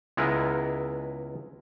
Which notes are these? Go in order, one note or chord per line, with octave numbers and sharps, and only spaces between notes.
C#2 G#3 B3 E4 A#4 B4